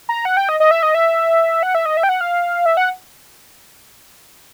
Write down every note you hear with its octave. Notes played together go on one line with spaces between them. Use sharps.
A#5
F#5
G5
D#5
D#5
E5
D#5
E5
F#5
E5
D#5
E5
G5
F#5
F5
E5
F#5